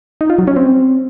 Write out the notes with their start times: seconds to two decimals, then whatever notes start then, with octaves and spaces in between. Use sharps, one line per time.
0.21 D#4
0.30 F4
0.39 F#3
0.47 C#4
0.56 C4